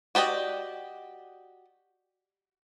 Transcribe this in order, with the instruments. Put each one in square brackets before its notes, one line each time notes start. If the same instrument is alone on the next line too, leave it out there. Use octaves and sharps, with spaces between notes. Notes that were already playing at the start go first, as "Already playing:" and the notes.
[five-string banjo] F#4 G4 D5 D#5